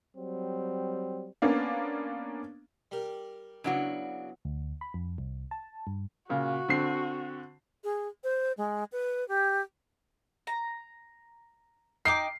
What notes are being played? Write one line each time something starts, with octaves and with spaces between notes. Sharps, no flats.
F#3 G3 C4
A#3 B3 C#4 D4 F5
G3 G4 A#4
C#3 F#3 B3 D4 E4 F#4
D2
B5
F2
C2
A5
G2
A#2 C#3 F#4
D3 C4 C7
G#4
C5
G#3
B4
G4
A#5
D#4 G5 D6 C7